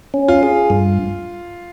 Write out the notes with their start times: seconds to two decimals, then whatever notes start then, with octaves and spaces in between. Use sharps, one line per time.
0.14 C#4
0.28 F4
0.43 G#4
0.70 G2